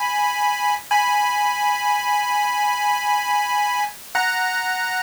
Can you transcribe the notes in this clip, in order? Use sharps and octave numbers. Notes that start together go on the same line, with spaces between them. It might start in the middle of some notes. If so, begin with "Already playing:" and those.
Already playing: G#5 B5
G#5 B5
F#5 A#5